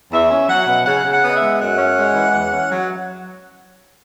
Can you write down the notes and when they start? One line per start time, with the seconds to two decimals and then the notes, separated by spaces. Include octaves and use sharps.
0.11 E2 E5
0.30 C#4
0.48 F#3 F#5
0.66 B2
0.85 C#3 F#5
1.04 C#3
1.10 F#5
1.21 B3
1.27 D#5
1.34 E5
1.40 G#3
1.59 F#2 F#5
1.78 C#4
1.96 G#3
2.13 E3
2.32 E2
2.50 C#4
2.69 F#3